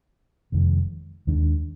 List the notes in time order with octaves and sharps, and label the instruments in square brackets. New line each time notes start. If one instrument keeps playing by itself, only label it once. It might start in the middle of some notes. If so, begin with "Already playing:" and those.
[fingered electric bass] F1 F2 D#3 G#3
D#2 D#3 G#3 D4